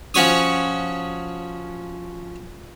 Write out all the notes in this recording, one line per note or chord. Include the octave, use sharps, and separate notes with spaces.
F3 C#4 F#4 C#5 C#6 D#6